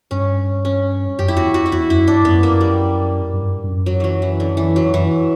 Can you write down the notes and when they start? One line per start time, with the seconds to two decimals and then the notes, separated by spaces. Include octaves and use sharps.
0.11 G2 C#4
0.65 C#4
1.19 F#2 G4
1.28 E4
1.36 E2 F#4
1.54 F#4
1.66 E4
1.72 E2 F#4
1.90 F#2 E4
2.07 G2 D4
2.25 F#2 B3
2.43 A#3
2.61 G3
3.33 G2
3.64 G2
3.68 F#2
3.86 F#3
4.00 E3 F#3
4.22 E3
4.40 D3
4.57 E3
4.76 F#3
4.93 F#2 E3